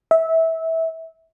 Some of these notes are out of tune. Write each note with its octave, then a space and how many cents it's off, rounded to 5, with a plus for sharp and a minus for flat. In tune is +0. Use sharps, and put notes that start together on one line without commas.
E5 -20